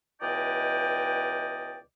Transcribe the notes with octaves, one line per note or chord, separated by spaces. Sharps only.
C#2 B2 E3 D5 D#5 G5